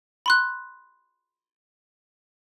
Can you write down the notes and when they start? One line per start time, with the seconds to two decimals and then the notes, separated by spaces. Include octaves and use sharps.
0.26 B5 C6 F#6